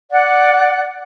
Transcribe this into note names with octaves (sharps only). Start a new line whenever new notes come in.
D5 F#5